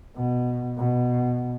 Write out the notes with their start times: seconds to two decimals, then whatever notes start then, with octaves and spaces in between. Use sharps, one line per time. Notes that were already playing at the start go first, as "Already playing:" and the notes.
0.16 B2
0.79 B2